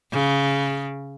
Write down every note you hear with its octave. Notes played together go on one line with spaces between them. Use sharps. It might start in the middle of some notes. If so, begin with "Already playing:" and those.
C#3